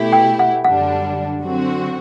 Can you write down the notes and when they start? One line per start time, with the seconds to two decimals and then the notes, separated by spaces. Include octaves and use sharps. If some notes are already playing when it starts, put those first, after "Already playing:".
Already playing: B2 A3 E4 G4
0.12 G5
0.39 F#5
0.64 F#2 D3 G3 D4 F#5
1.41 D3 F#3 C4 F#4